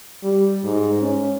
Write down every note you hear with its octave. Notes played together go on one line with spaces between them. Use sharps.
G3
G#2
C#4